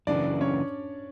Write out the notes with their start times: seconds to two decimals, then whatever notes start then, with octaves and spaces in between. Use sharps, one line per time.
0.07 F#2 C#3 E3 D4 D5
0.41 C#4 C#5